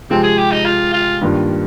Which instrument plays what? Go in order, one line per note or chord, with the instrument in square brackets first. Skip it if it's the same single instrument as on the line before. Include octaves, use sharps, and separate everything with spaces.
[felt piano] C3 F3 G#3 [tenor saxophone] C4
[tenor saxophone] G#4
G4
D#4
F4
F4
[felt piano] G2 D#3 A#3 D4 F4